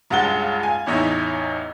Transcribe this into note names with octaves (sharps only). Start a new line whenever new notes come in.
C#2 G2 G#3 F#5 A6 G7
G#5
A1 E2 D#4 C#5 E5